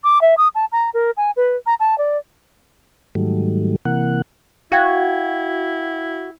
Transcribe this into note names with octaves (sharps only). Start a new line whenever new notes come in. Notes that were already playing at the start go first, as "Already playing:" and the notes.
D6
E5
D#6
A5
A#5
A#4
G#5
B4
A#5
A5
D5
G#2 D#3 F#3 G3 A3
C3 E3 A#3 F#5
E4 F#4 F5 G5 G#6